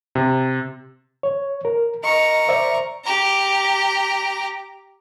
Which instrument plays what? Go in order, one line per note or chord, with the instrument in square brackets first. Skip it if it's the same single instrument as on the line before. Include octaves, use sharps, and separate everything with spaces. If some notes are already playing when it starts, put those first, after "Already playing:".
[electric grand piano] C3
[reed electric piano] C#5
A#4
[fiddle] A#4 C#6 [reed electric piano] D#5
[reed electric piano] C5 D5 E5
[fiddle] G4 A#5